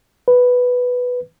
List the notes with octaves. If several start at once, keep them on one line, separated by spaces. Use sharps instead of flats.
B4